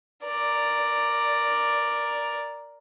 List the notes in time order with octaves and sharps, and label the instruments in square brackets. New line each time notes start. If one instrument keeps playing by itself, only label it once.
[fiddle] A#4 D5